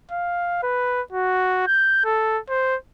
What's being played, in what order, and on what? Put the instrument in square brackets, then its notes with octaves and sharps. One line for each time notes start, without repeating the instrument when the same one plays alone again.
[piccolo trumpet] F5
B4
F#4
G6
A4
C5